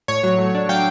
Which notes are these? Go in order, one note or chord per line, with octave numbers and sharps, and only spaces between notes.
A2 C#5
F#3 C#5
A3
D4
F#3 F5 G5